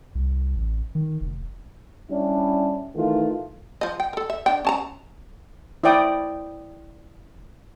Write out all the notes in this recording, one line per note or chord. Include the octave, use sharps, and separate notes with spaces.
C2
A1
D#3
F1
G3 C#4 D4 E4
D#3 E3 A3 F4
F3 D#5
G5
A4 A#4
E5
D4 G5
C#4 A5 A#5
E4 C5 D5 G5 D#6